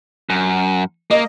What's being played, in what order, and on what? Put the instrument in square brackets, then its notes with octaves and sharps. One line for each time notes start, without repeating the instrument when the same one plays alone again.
[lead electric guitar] F#2
[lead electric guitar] A#3 [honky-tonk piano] D#5